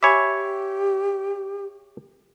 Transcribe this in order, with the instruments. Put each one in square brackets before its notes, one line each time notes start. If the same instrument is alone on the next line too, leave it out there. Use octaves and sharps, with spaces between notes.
[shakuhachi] G4 [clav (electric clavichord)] C#5 E5 [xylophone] G#5 B5 D6